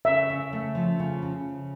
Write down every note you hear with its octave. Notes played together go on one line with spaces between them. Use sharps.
C#3 E5
C#3
A3
F3
C#3
C#3